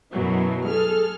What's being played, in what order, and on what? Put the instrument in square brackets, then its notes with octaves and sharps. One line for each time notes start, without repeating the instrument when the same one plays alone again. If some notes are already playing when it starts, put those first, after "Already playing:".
[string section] F#2 B2 E3 F#3
G#4 A4 F6